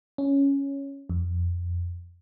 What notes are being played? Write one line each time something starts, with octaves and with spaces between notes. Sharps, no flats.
C#4
F2